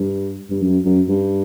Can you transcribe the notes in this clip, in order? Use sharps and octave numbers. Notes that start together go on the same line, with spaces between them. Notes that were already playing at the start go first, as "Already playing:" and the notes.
Already playing: G2
G2
F#2
F#2
G2